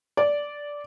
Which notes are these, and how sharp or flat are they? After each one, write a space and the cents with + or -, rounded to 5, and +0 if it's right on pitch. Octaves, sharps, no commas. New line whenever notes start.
D5 -10